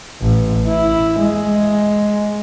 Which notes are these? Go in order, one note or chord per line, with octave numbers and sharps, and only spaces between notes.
A1
E4
G#3